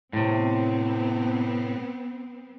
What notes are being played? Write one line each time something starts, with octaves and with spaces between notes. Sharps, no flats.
A2 C3 B3 C4